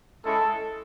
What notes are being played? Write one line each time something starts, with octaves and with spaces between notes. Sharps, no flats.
G#3 C#4 E4 A4